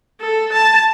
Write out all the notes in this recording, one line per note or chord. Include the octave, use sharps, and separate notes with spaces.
A4
A5